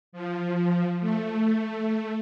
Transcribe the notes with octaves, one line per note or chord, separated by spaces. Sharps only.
F3
A3